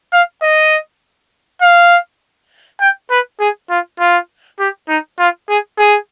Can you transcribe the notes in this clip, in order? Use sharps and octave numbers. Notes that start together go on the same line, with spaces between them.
F5
D#5
F5
G5
B4
G#4
F4
F4
G4
D#4
F4
G#4
G#4